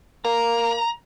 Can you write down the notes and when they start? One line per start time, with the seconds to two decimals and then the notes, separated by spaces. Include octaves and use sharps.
0.25 A#3 A#5